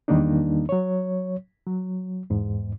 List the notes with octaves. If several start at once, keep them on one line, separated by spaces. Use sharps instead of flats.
E2 D#3 G3 A#3 D4 D#4
F#3 C#5
F#3
E2 G#2